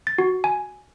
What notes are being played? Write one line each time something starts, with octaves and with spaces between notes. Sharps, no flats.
A6
F#4
G#5